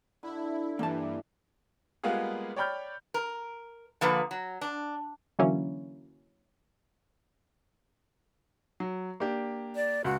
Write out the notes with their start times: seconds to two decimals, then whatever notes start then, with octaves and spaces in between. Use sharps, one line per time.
0.23 D3 E4
0.79 G2 E3 A#3 D4 E4 G4 A5
2.04 G3 G#3 A#3 B3 F4 G#4
2.56 C#5 D5 G5 B5 F6 G6
3.14 A#4
4.01 D3 F3 A#3 B4
4.31 F#3
4.61 D4
5.39 D3 E3 F#3 A#3 C#4 E4
8.80 F#3
9.20 A#3 D4 G4
9.76 D5
10.04 C#2 F#4